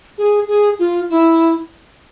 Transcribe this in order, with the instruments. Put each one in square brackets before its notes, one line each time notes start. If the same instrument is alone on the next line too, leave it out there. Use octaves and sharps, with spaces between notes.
[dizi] G#4
G#4
F4
E4